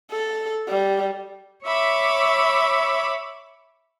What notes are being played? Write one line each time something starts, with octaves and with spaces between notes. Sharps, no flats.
A4
G3
C#5 E5 B5 D6